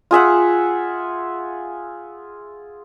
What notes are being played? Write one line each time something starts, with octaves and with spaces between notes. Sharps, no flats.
F4 G#4 E5 F#5